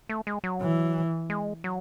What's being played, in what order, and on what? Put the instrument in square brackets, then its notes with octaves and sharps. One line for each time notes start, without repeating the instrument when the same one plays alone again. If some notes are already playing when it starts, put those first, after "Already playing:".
[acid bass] A3
G#3
F#3
[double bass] E3
[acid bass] G#3
F#3